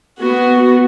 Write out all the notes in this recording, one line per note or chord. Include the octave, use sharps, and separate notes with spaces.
B3 F#4